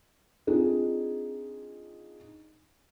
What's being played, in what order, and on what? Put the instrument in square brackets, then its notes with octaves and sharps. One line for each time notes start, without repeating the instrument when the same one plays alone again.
[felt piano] C4 D4 D#4 F4 G#4